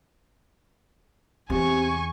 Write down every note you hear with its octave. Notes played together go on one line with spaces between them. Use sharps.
E2 C3 G#5 C#6